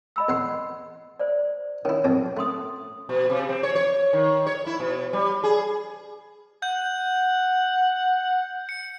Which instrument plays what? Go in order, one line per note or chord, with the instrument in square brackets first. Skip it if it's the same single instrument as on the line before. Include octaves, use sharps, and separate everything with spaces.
[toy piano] D#5 B5 E6
[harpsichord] E2 F#5 C6
[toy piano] C5 D5
[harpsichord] D#3 E4 [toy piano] C#4 C#5
[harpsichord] B1 F2 F3
[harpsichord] A3 [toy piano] C#4 C6 D#6
[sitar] B2
C3
C4
C#5
C#5
D#3
C#5
E4
B2
G3
G#4
[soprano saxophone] F#5 [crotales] G6
[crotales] C#7